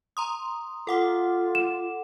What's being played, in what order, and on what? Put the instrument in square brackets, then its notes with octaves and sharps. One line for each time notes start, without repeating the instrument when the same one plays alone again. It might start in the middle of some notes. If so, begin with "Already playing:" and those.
[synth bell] A#5 C6 D#6
[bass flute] F4 [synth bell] A4 F#5 D6
[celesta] E7